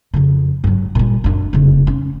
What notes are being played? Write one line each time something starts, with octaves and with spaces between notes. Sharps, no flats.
F2 C#3
G2 F#3
A#2 G3
F#2 D4
F1 C#3
C#4